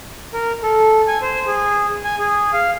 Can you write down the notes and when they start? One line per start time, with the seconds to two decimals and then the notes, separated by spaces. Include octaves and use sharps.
0.34 A#4
0.63 A4
1.08 G#5
1.22 C5
1.47 G#4
2.04 G#5
2.18 G#4
2.53 F5